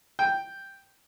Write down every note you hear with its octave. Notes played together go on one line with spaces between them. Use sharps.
G5